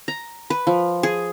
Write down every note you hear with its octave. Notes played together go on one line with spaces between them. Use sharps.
A#5
B4
F3
G#4